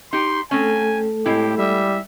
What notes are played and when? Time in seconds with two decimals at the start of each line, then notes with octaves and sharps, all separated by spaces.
0.13 D#4 G4 C6
0.51 A3 C4 C#4 A4 G#5
1.26 A2 G#3 C4 E4 G4
1.58 G3 E5